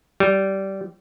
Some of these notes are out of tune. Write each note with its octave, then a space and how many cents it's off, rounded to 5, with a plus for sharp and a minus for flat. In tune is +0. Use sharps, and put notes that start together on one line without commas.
G3 -20